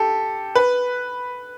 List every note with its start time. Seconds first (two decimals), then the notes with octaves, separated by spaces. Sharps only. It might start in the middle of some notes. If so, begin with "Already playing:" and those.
Already playing: G4 A4
0.55 B4